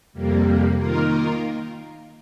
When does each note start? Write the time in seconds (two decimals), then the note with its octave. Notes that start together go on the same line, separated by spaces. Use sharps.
0.13 F2 C3 G3 A#3
0.77 D#3 A#3 F4 A#4